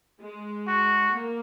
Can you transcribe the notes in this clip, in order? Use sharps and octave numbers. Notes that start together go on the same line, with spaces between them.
G#3
F#4
A#3